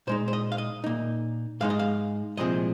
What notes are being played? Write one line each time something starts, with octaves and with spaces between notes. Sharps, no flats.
A#2 G#3 D#4 C5
C5
D#5
F5
D#5
A#2 A#3 D#4
G#2 G#3 D#4 F5
D#5
F5
C2 A#2 F3 G#3 C4 D#5